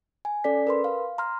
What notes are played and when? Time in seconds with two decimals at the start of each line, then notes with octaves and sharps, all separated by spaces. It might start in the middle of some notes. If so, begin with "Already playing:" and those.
0.25 G#5
0.44 C#4 A4 D5 B6
0.67 A#4 B4 C6
0.84 F5
1.18 A#5 C6 F6